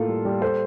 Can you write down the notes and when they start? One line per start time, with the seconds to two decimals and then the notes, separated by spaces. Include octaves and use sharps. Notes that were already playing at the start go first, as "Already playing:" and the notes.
Already playing: A2 A#3 F4 A4
0.08 G3
0.25 G3
0.42 G3 A4 C5